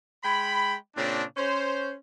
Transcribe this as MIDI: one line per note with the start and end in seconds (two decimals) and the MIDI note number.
0.24 0.74 56
0.24 0.74 79
0.24 0.74 83
0.96 1.23 46
0.96 1.23 49
0.96 1.23 60
0.96 1.23 62
1.37 1.93 61
1.37 1.93 72